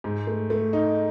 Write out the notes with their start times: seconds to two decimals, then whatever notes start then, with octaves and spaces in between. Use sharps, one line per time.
0.04 G#2
0.27 A3
0.50 A3
0.73 D#4